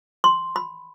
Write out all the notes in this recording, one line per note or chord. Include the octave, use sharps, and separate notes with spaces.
C6
B5